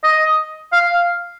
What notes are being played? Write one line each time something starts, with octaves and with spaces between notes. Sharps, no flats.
D#5
F5